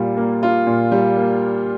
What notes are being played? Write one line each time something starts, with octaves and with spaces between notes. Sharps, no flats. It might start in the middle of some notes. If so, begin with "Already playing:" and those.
Already playing: A#2 G3 A#3 F4
A#3
F4
A#2
G3
A#3